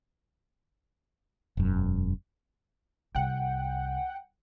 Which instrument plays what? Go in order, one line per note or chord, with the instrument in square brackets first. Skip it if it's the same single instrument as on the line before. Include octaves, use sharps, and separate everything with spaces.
[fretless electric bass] E1 F#2
[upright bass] C2 [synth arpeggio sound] F#5 G5